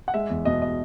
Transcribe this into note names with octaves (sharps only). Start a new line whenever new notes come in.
F#5
G#3 E5
E2
B2 D#5
D#5